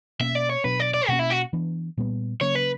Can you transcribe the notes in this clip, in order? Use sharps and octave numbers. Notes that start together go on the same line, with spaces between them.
B2 A#3 C#4 E5
D5
C#5
B2 F#3 B3 D4 B4
D5
D5
B2 A#3 C#4 F#4
E4
F#4
E3 B3 D4
A#2 G3 B3
C#3 F#3 A#3 C#4 C#5
B4